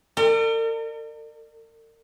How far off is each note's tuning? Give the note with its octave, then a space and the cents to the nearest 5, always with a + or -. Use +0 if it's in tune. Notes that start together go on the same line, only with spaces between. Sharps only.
A#4 -45 D5 +40